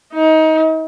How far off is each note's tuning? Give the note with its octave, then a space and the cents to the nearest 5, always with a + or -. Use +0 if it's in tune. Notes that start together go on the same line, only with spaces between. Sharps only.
D#4 +25